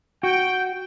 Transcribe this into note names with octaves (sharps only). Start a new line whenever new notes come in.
F#4 G5